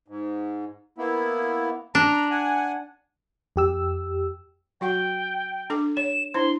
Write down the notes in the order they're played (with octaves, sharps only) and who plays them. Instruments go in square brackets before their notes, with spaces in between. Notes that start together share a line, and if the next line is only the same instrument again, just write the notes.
[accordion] G#2
A#3 B3 E4
[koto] D4 [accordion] A#5
[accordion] F#5 G#5
[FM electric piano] F2 G4 E6
[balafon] F#3 F#4 F#5 [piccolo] G5
[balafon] D4 A4 D6
[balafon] C#5 [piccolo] E7
[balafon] D4 E4 C5 [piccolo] C6